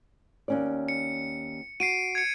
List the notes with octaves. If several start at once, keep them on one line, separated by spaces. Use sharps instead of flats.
D#2 C#4 D5
C#7
F#4 C7 D7 D#7
G#6 C#7